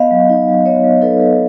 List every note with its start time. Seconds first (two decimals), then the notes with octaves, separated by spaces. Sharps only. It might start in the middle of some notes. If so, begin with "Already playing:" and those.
Already playing: B3 D#5 F5
0.11 F#3
0.29 D#4
0.48 F#3
0.66 B3 C#5 D#5
0.84 F#3
1.02 D#4 A4 B4
1.20 F#3